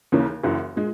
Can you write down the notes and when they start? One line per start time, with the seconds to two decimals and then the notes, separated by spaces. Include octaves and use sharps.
0.12 D#2 C#3 E3 A#3 C#4
0.43 F#1 F#2 E3
0.76 A#2 G#3